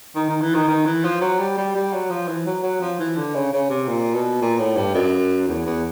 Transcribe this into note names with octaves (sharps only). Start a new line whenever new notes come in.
D#3
D#3
E3
D#3
D#3
E3
F3
F#3
G3
G3
G3
F#3
F3
E3
F#3
F#3
F3
E3
D3
C#3
C#3
C3
A#2
B2
A#2
A2
G2
F#2
E2
E2